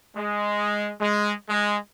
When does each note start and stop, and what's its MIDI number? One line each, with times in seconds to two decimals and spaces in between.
0.16 0.94 56
1.01 1.33 56
1.50 1.78 56